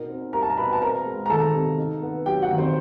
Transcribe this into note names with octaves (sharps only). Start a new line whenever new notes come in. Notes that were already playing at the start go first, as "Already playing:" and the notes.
Already playing: B2 D#4 A#4
C4
G3 A#4 A#5
A5
A#5
B2 B4 B5
A5
C4 A#4 A#5
G#3
A#5
D#3 A4 A5
C3
D#4
B3
F#3 G4 G5
F#4 F#5
D#3
C4 C5